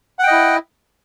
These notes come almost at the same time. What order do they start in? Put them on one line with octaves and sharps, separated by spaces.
F#5 G5 D#5 E4